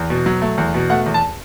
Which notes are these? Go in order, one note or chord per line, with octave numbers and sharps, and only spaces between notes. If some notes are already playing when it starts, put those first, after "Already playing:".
Already playing: E2
B2
F#3
A3
E2
B2
A3 F#5
E2
A5